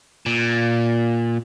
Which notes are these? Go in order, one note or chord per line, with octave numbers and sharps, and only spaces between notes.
A#2